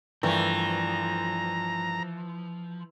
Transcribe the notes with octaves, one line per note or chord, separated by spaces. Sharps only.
G2 E3 F3 A3 A#4 A#5